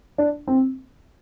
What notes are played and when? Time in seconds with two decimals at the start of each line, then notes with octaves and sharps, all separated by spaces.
0.18 D4
0.47 C4